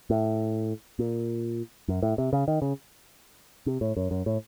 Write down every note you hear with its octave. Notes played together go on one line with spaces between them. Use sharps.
A2
A#2
F#2
A2
C3
C#3
D#3
C#3
C3
A2
F#2
F#2
A2